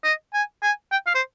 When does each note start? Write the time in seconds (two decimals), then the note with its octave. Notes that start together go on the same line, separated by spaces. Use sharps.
0.04 D#5
0.34 G#5
0.63 G#5
0.92 G5
1.07 F5
1.15 C5